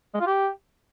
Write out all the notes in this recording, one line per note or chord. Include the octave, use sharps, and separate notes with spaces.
G#3
F4
G4